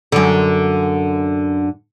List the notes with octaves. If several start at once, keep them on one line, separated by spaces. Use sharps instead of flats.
F#2 D3